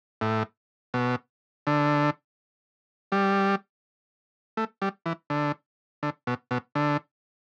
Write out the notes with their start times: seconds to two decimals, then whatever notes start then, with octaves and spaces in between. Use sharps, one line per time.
0.21 A2
0.94 B2
1.67 D3
3.12 G3
4.57 A3
4.82 G3
5.06 E3
5.30 D3
6.03 D3
6.27 B2
6.51 B2
6.75 D3